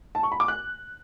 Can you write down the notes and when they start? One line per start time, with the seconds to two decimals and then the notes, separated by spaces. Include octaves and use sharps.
0.15 A5
0.23 C#6
0.32 B5
0.40 D6
0.48 F#6